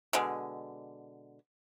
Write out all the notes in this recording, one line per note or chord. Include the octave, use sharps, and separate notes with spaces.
B2 D3 G#3